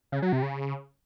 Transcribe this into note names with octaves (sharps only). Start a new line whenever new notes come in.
C#3
F#3
C3
C#3